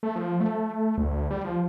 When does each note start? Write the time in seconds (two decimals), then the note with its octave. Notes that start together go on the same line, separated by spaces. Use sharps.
0.03 A3
0.16 F3
0.40 A3
0.98 D2
1.31 G3
1.44 F3